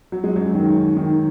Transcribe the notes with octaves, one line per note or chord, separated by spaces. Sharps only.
F#3
G#3
F#2 F#3
D#3
D#3